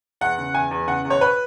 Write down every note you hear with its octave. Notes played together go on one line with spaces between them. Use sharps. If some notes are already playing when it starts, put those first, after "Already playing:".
E2 F#5
C#3
E2 G#5
E2
C#3 F#5
E2
C#5
B4